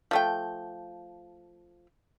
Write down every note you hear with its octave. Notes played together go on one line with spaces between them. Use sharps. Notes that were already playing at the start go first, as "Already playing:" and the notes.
F3 A3 G5